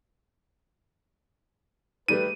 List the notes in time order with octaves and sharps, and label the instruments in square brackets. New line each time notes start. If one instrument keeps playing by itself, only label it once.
[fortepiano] D#3 G3 A3 [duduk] B4 [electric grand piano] D#7